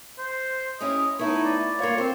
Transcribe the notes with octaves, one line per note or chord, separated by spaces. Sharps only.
C5
C#4 E4 G4 D#5
A3 B3 D#4 E4 C#5
D5
G2 A#3 F4 C#5
C4 C5